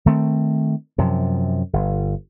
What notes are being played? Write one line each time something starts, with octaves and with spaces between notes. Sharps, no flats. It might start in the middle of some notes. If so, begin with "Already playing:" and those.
D#3 A3 C4
F#2 C3 F3
G1